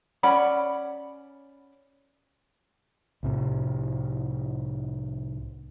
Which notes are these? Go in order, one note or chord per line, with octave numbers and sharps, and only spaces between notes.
C#4 D5 F#5 B5
C2 A2 C3